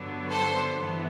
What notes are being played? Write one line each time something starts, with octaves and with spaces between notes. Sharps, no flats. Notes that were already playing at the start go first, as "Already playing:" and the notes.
Already playing: G2 D3 F#3 B3 D4
A4 C5
G2 E3 B3